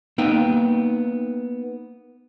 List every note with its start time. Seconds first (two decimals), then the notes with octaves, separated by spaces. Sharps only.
0.18 A#3 B3 D#4 G5